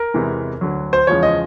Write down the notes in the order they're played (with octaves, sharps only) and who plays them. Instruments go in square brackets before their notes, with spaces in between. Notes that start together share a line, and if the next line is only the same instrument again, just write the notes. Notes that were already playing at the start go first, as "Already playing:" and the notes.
Already playing: [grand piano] A#4
E2 C3 E3 G#3
D2 D3 F#3
C5
E2 C#3 F3 G#3 C#5
D#5